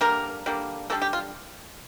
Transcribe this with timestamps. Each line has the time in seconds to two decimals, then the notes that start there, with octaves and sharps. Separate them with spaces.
0.01 D3 G3 A#3 A#4
0.46 D3 G3 A#3
0.90 D3 G3 A#3 A4
1.02 G4
1.13 F4